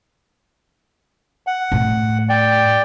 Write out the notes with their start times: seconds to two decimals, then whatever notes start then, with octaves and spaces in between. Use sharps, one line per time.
1.47 F#5
1.72 A2
2.29 D5 G5